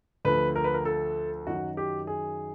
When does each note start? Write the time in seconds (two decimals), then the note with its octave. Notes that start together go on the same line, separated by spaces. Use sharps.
0.25 D2 D3 F3 B4
0.55 A#4
0.64 B4
0.74 A#4
0.85 A4
1.46 F#2 D#3 F#3 F#4
1.77 G4
2.07 G#4